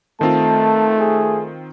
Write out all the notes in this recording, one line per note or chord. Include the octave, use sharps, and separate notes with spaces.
D#3 A3 C4 F4 A5
G#4